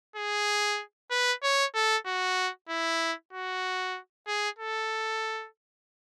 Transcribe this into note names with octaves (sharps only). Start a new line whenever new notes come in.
G#4
B4
C#5
A4
F#4
E4
F#4
G#4
A4